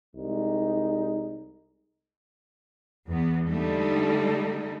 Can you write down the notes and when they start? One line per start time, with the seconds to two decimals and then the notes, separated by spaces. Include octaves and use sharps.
0.15 C2 G#3 D#4
3.08 E2 B3
3.48 D3 G3 A3 D#4 A4